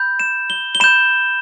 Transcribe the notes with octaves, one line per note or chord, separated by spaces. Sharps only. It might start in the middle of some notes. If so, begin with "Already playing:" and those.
Already playing: B5 G6
E7
G7
G7
B5 G6 E7